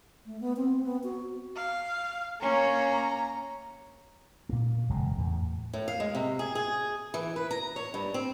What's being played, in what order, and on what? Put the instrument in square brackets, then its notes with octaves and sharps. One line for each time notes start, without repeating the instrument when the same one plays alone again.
[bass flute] A3
B3
C4
B3
F#4
[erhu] F5
[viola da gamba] A#3 C#4 [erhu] A#5
[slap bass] A#2 A#3
E1 F#2 C#3 G#3
E2 A2
[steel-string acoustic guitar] A2
F5
G#3
C3
G#4
G#4
E3
B4
A#5
C#5
G2
C4